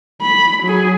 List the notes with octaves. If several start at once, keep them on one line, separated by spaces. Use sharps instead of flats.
B5
F#3 G#4